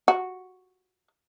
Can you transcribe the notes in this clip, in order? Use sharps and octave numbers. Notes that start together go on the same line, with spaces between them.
F#4